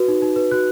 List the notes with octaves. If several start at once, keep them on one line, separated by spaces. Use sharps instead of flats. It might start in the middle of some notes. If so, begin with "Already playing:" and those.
Already playing: F#4 B4
D#4
D#4
B4
F#4 F#6